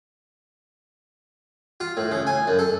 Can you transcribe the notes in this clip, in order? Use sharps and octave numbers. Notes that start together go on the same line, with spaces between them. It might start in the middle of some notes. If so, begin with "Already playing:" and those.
F4
A2
C#3
G#5
F#2
A4